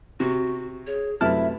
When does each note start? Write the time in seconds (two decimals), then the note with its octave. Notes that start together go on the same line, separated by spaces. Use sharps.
0.20 C3 F#4
0.87 G#4 C#5
1.21 F#2 C3 A3 E4 B4 E5 A5 F6